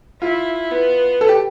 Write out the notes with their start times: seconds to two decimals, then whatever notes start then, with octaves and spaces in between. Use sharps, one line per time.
0.22 E4 F4
0.71 B3
1.21 A4
1.29 G4